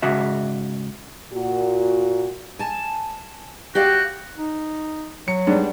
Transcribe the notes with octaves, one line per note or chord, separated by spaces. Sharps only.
G#2 C#3 F#4 E5
A#2 F#4
G#5 A5
F#4 G4 D5 F5
D#4
F#3 C#7
G#2 G3 B3 D4